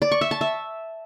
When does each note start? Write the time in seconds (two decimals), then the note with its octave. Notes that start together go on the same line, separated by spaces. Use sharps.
0.02 D5
0.11 C#6
0.21 E5
0.31 A5
0.41 E5